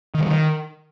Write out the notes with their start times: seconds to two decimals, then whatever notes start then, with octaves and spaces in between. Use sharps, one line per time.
0.14 D#3
0.20 G3
0.27 D#3